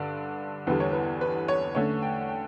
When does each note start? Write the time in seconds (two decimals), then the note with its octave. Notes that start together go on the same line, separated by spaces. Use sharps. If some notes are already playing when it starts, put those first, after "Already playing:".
Already playing: G2 D3 D5
0.67 E2 D3 G3 B4
0.80 C#5
0.93 B4
1.21 B4
1.48 C#5
1.75 D3 A3 C#4 C#5
2.02 G5
2.21 F#5
2.29 G5